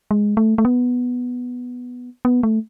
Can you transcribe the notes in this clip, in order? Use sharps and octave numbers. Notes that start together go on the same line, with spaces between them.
G#3
A3
A3
B3
B3
A3